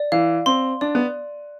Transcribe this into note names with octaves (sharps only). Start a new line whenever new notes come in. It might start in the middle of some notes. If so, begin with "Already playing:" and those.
Already playing: D5
E3 F5
C4 C6
D4 D5
B3